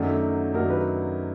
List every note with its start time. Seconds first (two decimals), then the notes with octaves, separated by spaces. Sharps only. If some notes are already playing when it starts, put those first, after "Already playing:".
Already playing: F#2 D#3 F#3 A3 D4 A4
0.54 F#2 D#3 F#3 A3 D4 A#4
0.70 B4